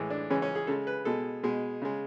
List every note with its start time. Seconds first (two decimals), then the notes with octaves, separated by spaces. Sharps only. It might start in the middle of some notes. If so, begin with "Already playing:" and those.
Already playing: A2 E3 G#3
0.10 D4
0.30 C#3 E3 G#3 C#4
0.42 C#4
0.55 G#4
0.67 C#3 G#3 A4
0.87 B4
1.05 B2 G#3 A4
1.43 B2 G#3
1.82 C#3 G#3